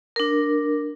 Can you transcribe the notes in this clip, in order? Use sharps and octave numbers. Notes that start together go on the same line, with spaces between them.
D4 A#4